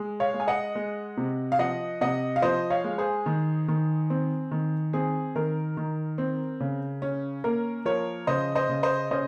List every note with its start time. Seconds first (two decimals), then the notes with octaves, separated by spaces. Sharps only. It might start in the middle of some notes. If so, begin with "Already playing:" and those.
Already playing: G#3
0.20 C#5 F5
0.34 G#3
0.40 G#5
0.48 D#5 F#5
0.75 G#3
1.17 C3
1.52 F5
1.59 F3 D#5 F#5
2.01 C3 D#5 F#5
2.36 F5
2.42 F3 C5 D#5
2.70 C#5 F5
2.84 G#3
2.98 G#4 C5
3.26 D#3
3.68 D#3
4.10 C4
4.51 D#3
4.93 C4 G#4
5.35 D#3 A#4
5.77 D#3
6.18 C4
6.60 C#3
7.02 C#4
7.44 A#3 A#4
7.85 F3 A#4 C#5
8.27 C#3 C5 D#5
8.55 C5 D#5
8.69 C#3
8.83 C5 D#5
9.11 C#4 C5 D#5